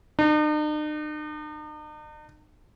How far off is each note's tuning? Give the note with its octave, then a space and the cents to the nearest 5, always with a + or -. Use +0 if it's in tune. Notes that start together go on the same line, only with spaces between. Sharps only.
D#4 -45